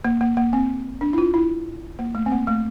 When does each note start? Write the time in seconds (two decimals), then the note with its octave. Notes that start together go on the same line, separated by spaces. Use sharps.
0.05 A#3
0.21 A#3
0.37 A#3
0.53 C4
1.01 D4
1.13 E4
1.18 F4
1.34 E4
1.99 A#3
2.15 A3
2.26 C4
2.32 A#3
2.47 A3